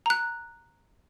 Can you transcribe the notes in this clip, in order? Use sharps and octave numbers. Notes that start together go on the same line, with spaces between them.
A#5 F#6